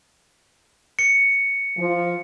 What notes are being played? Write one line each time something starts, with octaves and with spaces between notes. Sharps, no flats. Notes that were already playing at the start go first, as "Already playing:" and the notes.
C#7
F3